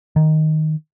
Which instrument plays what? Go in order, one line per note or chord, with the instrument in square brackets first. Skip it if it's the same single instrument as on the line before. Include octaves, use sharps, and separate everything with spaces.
[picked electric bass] D#3